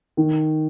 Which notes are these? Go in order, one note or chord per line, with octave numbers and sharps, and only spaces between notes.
D#3